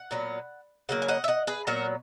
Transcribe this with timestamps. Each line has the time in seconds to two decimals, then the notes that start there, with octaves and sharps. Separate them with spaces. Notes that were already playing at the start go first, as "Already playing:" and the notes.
Already playing: F#5
0.11 A#2 F#3 B3
0.89 C#3 F#3 A#3 F#5
1.02 G#5
1.08 D#5 F#5
1.24 E5
1.28 D#5 F#5
1.47 G#4 B4
1.67 A#2 F#3 B3 F#4 A#4